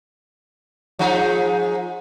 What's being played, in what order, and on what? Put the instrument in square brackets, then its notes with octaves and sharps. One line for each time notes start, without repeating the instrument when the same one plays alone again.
[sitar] F3 G#3 D#4